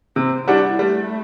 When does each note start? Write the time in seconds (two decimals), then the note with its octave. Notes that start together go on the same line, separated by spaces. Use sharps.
0.16 C3 C4
0.48 G3 D4 E4 F#4
0.79 G3 A3